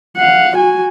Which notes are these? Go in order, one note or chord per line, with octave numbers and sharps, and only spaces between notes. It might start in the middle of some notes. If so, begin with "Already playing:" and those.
F5 F#5
F#4 G#5